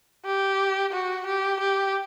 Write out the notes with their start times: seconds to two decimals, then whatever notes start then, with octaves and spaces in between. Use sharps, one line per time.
0.25 G4
0.92 F#4
1.26 G4
1.60 G4